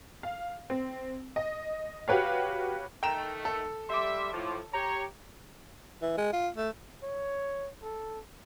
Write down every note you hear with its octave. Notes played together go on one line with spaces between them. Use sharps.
F5
C4
D#5
F#4 G4 B4 C#5 F5
D#3 A3 G5 A#5 E7
A4
G3 E5 C6 D6
A2 F3
G4 C#5 A#5
E3
G#3
F4
A3
C#5
A4